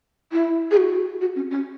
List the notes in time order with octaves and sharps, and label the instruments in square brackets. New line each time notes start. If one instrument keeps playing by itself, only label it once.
[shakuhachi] E4
G#4
F#4
F#4
C#4
C#4